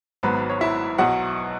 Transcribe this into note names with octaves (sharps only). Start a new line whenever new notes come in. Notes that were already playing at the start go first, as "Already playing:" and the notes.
G#1 G#2 F#3 B3 B4
C#5
E4 E5
B1 B2 F#3 F#4 F#5